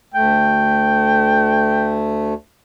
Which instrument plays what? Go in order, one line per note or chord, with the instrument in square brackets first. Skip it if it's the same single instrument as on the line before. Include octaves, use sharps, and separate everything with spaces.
[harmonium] D2 A3 [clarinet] G5